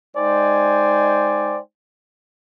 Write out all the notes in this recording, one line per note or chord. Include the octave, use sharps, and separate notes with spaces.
G#3 D#4 C5 D5 G5 G#5